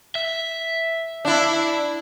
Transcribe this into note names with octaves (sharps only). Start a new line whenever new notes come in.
E5
D4 E4